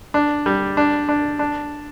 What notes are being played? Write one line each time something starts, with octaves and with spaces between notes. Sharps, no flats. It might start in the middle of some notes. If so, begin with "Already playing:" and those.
D4
G3
D4
D4
D4